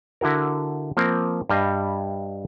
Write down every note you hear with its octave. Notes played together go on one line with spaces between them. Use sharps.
D3 E4 F#4 A#4
F3 A#3 C4 A#4
G2 G3 D#5 F5